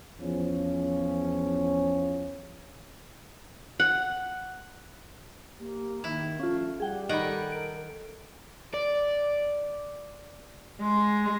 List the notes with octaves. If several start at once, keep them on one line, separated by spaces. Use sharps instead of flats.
E2 F3 C#4
F#5
A#3 G4
D#3 E4
A#1 A3 C#4 F4 F5
G3 G4 G#4 F#5 G5
D#3 A4 D#5 F#5 G5 B5
A#4 D7
D5
G#3